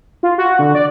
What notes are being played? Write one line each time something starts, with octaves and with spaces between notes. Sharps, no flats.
F4
F#4
D3
D5